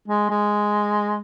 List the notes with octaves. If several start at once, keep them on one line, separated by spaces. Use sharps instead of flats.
G#3
G#3